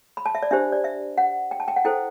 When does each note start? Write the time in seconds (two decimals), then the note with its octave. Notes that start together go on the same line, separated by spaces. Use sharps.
0.17 B5
0.26 A5
0.35 E5
0.43 D5
0.51 D4 G4 C5 E5
0.72 D5
0.84 E5
1.18 F#5
1.51 G5
1.60 A5
1.68 G5
1.76 F#5
1.85 E4 A4 C5 G5